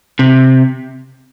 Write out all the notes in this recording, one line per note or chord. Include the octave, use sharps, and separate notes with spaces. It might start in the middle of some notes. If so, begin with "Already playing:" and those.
C3